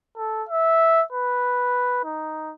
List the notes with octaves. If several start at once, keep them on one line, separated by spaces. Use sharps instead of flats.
A4
E5
B4
D#4